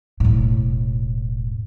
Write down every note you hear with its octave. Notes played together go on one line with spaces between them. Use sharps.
E1 A2